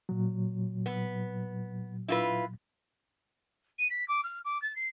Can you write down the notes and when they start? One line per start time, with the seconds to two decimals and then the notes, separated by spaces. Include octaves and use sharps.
0.09 A#2 F#3
0.86 B3
2.08 E4 F4 B4
3.78 D#7
3.90 B6
4.08 D6
4.24 F6
4.45 D6
4.62 A6
4.76 C7